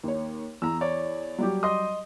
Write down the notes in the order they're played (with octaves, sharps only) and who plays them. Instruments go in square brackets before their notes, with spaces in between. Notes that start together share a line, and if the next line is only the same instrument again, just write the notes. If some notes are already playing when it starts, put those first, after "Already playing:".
[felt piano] D#2 C#5
[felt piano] E2 [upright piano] A#5 E6
[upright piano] C#5 D5
[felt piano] F#3 G3 G4
[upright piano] D#5 C6 D#6